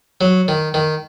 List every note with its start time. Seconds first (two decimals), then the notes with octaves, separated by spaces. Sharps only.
0.21 F#3
0.48 D#3
0.74 D#3